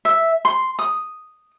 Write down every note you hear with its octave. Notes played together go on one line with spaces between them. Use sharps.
E5
C6
D#6